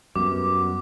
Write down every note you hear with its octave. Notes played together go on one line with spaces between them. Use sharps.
F#2 G3 B3 D6